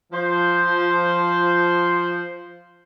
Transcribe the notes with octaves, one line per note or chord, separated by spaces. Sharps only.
F3 C5